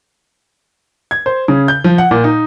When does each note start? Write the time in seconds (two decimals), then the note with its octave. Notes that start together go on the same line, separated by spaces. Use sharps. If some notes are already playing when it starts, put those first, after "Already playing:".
1.11 G#6
1.26 C5
1.48 C#3
1.68 G6
1.84 F3
1.98 F#5
2.11 A#2
2.24 D#4